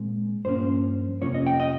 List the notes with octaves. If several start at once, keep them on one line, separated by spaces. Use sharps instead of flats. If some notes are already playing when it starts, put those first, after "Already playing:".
Already playing: A#2 G#3 C4
G2 F3 A#3 C#4 C5
F2 C3 F3 A#3 C#4 C#5
D#5
G5
D#5